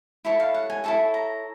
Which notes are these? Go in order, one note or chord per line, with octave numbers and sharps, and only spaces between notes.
E4 A4 C#5 B5
F5
F#5
G#5
E4 A4 C#5 A5
A#5